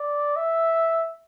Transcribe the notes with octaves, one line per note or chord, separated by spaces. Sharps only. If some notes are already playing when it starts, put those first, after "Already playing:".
Already playing: D5
E5